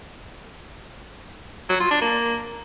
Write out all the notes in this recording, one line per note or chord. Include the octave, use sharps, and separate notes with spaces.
F#3
F4
D4
A#3